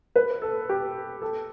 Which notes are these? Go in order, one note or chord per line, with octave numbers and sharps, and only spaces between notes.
B4
A4
G4
A4